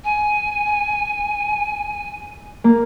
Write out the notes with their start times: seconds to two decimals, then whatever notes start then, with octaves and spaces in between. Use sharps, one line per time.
0.05 G#5
2.64 A#3